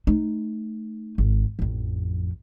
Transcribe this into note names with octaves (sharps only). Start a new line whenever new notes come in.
A3 D#4
G#1
A1 F2